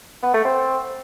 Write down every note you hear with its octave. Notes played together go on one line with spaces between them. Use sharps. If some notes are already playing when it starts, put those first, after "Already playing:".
B3
A3
C4